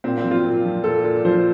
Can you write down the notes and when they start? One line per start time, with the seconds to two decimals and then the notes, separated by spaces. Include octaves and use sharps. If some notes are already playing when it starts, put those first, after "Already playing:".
0.04 A#2 C4
0.18 C4
0.24 F3
0.31 F4
0.44 A#2
0.65 F3
0.84 A#2 A4
1.04 A#2
1.25 F3 C5